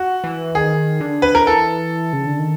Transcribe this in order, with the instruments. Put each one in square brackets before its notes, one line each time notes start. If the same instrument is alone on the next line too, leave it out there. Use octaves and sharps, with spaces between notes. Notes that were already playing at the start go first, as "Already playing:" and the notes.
Already playing: [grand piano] F#4
[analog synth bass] E3
[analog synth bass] D#3 [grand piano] G#4
[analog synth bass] D3
[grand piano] B4
A#4
[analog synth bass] E3 [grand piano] A4
[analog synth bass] C#3
D3
D#3